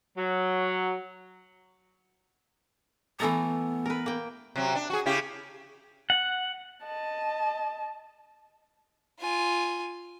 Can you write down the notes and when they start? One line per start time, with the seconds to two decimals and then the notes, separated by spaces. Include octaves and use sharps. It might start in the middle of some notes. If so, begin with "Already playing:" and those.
0.18 F#3
3.20 E3 A3 B3 A#5
3.86 A#4 B4
4.06 A#3 G5
4.56 C3 F#3
4.75 D4
4.90 F#4 G#4
5.06 C#3 E4 G4
6.10 F#5
6.86 D#5 A5
9.20 F4 G#5